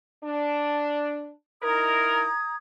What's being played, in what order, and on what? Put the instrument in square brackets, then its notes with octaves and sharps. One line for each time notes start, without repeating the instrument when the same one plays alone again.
[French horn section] D4
[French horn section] D#4 E4 A#4 [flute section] A#5 D#6 G#6